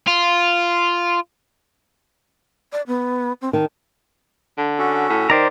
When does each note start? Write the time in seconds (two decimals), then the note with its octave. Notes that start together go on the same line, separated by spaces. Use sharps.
0.07 F4
2.72 D5
2.87 B3
3.42 C4
3.53 D#3 A5
4.58 D3
4.79 C#4 F#4 A4
5.10 A2
5.30 D#3 C5 D5 A#5